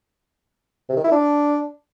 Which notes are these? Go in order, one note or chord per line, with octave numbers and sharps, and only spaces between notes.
C3
D#3
E4
D4